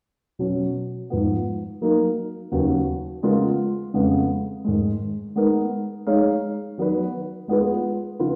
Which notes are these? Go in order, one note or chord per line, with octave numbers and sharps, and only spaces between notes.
B2 F#3 C#4
G#2 F3 B3
F#3 A#3 D#4 A#4
D#2 C#3 F#3 B3 F#4
C#3 G#3 B3 F4 A#4
F2 C#3 G#3 B3
G#2 D#3 G#3
G#3 B3 D#4 A#4
G#3 D#4 G#4 C#5 F5
D#3 F#3 B3 F#4 B4
G#3 B3 F4 G#4 B4
C#3 F3 B3 F4 B4